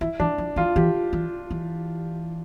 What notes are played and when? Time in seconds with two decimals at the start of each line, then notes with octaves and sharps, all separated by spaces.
0.01 E3 E4
0.20 E3 D4
0.38 F3
0.56 E3 F4
0.76 E3 G4
1.13 E3
1.51 E3